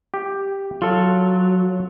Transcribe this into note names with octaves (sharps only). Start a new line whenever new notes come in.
G4
F#3 F4 A4